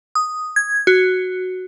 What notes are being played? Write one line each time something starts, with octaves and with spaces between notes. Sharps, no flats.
D#6
G#6
F#4